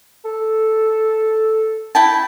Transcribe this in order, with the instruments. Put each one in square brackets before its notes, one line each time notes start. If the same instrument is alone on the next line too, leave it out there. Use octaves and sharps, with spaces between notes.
[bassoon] A4
[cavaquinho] E4 G5 A5